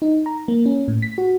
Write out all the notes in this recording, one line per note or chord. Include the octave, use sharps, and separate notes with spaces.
D#4
A#5
A#3
C#4
A2
B6
F#4